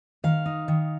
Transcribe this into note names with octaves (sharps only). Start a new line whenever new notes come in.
D#3 F5
D#4
D#3